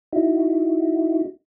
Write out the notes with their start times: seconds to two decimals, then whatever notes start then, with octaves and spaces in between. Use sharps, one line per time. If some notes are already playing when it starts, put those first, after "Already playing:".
0.13 D#4 E4 F#4